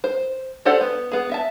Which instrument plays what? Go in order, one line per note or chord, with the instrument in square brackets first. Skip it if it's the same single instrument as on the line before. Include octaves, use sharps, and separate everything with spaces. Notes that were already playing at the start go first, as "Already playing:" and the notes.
[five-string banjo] C5
D4 G4 A4 C5 F#5
B3
B3 G#4
E5 A5